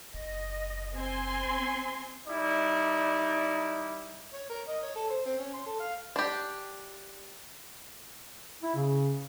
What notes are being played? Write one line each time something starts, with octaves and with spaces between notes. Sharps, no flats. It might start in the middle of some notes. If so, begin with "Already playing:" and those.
F#1 D#5
C4 G#5 C6
G3 D#4 E4 D5
C#5
A#4
D#5
C#5
A4
C5
C4
C#4
C6
A4
F5
D4 G4
E4
C#3